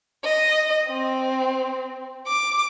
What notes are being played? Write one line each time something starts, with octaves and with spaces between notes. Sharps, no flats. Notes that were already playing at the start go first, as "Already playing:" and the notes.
D#5
C4
D6